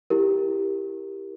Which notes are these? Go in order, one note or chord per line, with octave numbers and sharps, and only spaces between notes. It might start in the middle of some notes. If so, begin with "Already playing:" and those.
E4 G4 A#4